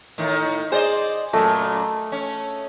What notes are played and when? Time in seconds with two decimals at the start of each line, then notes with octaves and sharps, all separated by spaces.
0.18 A2 D#3
0.72 G#4 C5 D5 D#5
1.33 F#2 A#2 A3 D#5
2.12 C#4